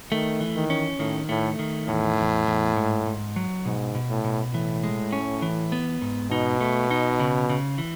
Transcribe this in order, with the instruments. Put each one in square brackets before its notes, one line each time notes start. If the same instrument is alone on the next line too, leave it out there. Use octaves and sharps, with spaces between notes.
[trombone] D#3 [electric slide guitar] A3
[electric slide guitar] E3
[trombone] D#3
[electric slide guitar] C#4
[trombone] A2 [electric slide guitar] D#3
[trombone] A2 [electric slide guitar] A3
[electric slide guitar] D#3
[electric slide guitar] E2 [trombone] A2
[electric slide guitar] E2
E2
G#2
G#2
F#3
[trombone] G#2 [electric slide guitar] B2
[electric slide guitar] B2
[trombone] A2
[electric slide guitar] B2
[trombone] A2 [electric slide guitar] E3
[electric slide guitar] G#3
C#4
E3
B3
G#2
[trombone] B2 [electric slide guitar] D#4
[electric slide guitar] A3
D#4
C#3
C#3
E3